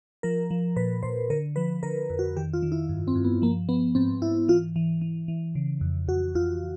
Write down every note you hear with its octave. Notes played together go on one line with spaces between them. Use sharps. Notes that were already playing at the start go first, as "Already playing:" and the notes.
F3 A#4
F3
A#2 B4
A#2 C5
D3 A#4
F3 B4
D3 A#4
F2
F#4
D#3 G4
F4
D#3
E4
G2
C4
G2
B3
F3 A#3
F3 B3
G#2 C4
G#2 E4
E3 F4
E3
E3
E3
C#3
F2
F2 F#4
F2 F4